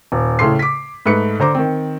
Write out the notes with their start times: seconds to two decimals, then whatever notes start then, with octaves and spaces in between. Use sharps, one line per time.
0.12 D#1
0.39 A2 C#3 A4 C6 C7
0.59 D6 B6
1.06 G#2 A3 B4 C#7
1.40 D3 C5 A#5 D6
1.54 D#3 C4